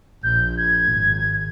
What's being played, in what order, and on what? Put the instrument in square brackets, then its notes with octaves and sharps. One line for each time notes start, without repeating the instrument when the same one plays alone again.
[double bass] A#1 [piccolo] G6
[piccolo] G#6
[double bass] G#1